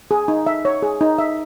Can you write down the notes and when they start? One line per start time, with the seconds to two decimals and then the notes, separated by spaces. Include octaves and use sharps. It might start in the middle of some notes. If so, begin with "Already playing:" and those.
0.11 G#4
0.28 D#4
0.47 E5
0.65 C#5
0.82 G#4
1.01 D#4
1.18 E5